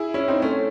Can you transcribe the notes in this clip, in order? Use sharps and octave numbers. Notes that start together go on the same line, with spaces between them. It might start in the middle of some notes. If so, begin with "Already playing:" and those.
Already playing: E4 G#4
C#4 E4
C4 D#4
A3 C#4